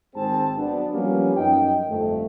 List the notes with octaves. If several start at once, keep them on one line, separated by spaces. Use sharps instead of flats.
G#1 G#2 C4 G#4 A5
F#3 B3 D4
F3 G3 A#3 B3 C#4
F#2 D#4 G5
G1 F2 A3